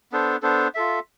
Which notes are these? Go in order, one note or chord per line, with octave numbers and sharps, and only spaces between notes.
B3 D4 A4 C5
B3 D4 A4 C5
F4 A4 E5